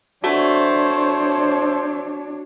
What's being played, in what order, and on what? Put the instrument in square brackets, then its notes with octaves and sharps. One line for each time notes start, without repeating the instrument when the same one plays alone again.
[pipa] A3 [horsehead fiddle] D4 C#5 [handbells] F#4 [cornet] C5